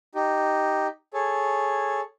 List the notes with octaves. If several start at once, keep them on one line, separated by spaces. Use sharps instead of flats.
D#4 G4
G#4 A4 C#5